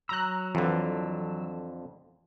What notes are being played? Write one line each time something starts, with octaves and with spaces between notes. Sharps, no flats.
F#3 A#5 E6 F#6
F2 D3 E3